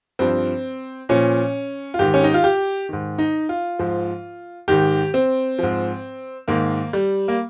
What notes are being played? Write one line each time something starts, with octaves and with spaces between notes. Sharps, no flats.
G2 F3 C4
A#2 F3 C#4
F4
G#2 D#3 G4
C#4
D#4
F4
G4
G#2 D#3
D#4
F4
G#2 F3
G#2 D#3 G4
C4
G#2 F3
G#2 D#3 A#3
G3
A#3